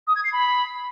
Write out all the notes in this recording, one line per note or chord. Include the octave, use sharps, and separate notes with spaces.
D#6
G#6
C7
B5